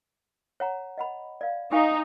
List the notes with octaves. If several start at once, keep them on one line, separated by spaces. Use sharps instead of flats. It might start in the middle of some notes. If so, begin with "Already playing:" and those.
C#5 F#5 A#5
D#5 F#5 B5
D5 F5
D#4 F5 G#5 C#6